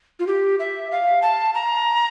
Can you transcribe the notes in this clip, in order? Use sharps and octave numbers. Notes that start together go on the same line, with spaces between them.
F4
G4
E5
F5
A5
A#5